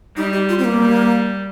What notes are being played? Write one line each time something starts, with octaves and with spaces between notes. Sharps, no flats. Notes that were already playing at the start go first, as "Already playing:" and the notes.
G3 D#4
G4
F4
C4
A#3
G3